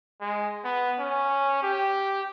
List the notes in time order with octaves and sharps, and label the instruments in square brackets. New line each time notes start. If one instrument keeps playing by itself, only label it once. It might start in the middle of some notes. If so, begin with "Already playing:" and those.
[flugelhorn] G#3
B3
C#4
G4